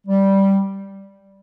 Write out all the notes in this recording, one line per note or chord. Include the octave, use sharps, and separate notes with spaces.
G3